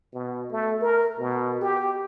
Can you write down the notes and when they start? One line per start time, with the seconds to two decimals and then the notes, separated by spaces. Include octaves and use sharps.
0.13 B2
0.51 A3
0.81 A#4
1.19 B2
1.62 G4